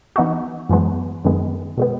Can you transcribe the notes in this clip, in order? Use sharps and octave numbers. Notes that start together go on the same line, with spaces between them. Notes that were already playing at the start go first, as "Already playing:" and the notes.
E3 B3 D#4 F#4
F#2 E3 G#3 B3
F#2 D#3 G#3 B3
B2 G#3 B3